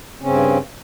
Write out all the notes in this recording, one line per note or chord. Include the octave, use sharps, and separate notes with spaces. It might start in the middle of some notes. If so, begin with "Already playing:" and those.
G2 C#3 C4 C#4